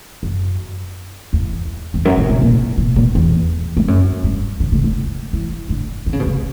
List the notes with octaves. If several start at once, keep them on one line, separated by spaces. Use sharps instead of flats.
F#2
E2
E2
F#2
A#2
B2
A#2
B2
A#2
E2
G2
F#2
G2
D3
C#3
D3
E3
D3
D3
C#3
B2
C#3